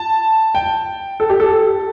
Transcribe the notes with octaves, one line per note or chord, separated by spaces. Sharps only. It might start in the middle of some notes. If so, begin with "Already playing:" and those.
Already playing: A5
G5
A4
G4
A4